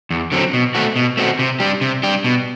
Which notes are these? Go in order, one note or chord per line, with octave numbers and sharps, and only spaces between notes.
E2
D3 F#3 C4
B2
A3 C4 F#4
B2
A3 C4 F#4
C3
G3 D4 G4
C3
G3 D4 G4
B2